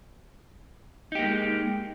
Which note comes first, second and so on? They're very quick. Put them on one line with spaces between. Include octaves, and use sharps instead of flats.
D#4 G4 A#3 G#3